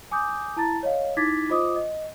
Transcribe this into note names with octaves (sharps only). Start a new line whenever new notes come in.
G#5 D6 D#6 G6
E4 A5 A#5 A6
C#5 D#5 F5
D#4 E4 D6 G#6 A6 B6
F4 C5 D#5 D6 D#6
D#5